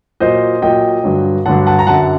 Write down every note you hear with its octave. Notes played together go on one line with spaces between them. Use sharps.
A#2 F#3 C5 D#5
A#2 F#3 D#5 G5
G2 D3 F#3
G2 D3 F#3 F#5 A5
F#5 A5
A#5
F#2 D3 F#3 F#5 A5